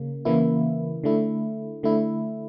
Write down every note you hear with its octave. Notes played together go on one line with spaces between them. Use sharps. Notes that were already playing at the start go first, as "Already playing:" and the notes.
Already playing: C#3 A#3
C#3 E3 A#3 E4
D3 A3 E4
D3 A3 E4